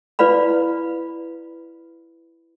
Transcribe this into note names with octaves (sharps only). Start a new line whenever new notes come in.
E4 B4 D5 F5 B5